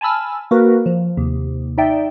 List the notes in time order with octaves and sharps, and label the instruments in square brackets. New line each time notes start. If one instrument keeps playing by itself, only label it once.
[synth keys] G#5 A5 B5 E6 F6
A#3 F#4 A#4 B4
F3
D#2 C3
D#4 D5 E5 G5